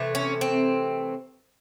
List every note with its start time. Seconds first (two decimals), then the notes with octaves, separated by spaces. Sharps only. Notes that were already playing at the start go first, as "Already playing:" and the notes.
Already playing: C3 E3 A3
0.15 C#4
0.41 C4